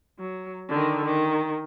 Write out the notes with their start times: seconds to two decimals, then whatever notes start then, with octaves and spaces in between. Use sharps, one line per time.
0.19 F#3
0.69 D3 D#3
1.06 D#3